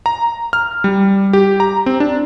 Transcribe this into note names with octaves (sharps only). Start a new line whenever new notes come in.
A#5
F6
G3
G4
A#5
C4
D4